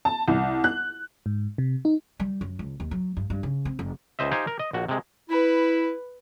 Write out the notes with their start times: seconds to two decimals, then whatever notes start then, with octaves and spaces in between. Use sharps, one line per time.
0.05 A5
0.28 C2
0.64 F#6
1.26 G#2
1.58 C3
1.85 D#4
2.20 G3
2.41 F#2
2.59 C#2
2.80 D#2
2.91 F#3
3.17 G2
3.30 G2
3.43 C#3
3.65 C4
3.79 F#1
4.19 C#2 C5 D#5 E5
4.31 D#4 G4 C5 F5 G5 G#5
4.47 A#4
4.59 D#5
4.73 A#1 F#4
4.89 C3 G#3
5.30 E4 B4